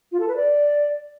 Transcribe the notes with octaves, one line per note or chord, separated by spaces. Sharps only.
F4
A4
B4
D5